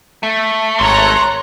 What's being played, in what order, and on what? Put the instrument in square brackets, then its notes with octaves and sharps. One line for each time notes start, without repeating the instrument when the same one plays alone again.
[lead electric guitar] A3
[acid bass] G#1 [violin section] C#5 A#5 F#6 [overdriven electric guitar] C6